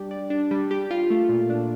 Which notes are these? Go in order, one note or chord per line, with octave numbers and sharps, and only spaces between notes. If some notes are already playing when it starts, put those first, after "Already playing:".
Already playing: G3 D4 G4 D5
D5
D4
G3
G4
F4
A3
A#2
D4